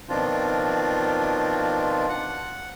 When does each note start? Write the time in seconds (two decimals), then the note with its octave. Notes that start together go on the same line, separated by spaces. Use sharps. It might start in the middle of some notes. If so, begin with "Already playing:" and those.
0.09 B2 D#3 F3 C4 D4 F4
2.09 F#5